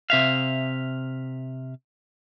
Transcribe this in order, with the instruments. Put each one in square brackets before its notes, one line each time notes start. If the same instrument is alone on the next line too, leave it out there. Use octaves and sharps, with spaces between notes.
[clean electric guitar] C3 E5 F5